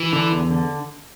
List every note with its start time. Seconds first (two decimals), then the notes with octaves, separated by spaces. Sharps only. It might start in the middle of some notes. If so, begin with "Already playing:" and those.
Already playing: E3
0.13 D3
0.32 E2
0.50 D3